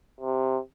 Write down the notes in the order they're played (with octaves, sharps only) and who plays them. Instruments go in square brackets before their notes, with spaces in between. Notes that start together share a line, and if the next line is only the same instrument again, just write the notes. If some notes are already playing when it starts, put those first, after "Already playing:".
[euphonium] C3